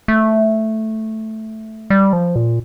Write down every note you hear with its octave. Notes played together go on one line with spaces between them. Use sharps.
A3
G3
F3
A#2